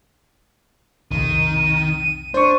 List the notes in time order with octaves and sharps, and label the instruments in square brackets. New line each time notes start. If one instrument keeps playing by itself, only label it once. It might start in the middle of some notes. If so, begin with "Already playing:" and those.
[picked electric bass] B1 F2 C3 [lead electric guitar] D#3 [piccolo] D#7
[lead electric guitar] D4 [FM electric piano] C5 C#6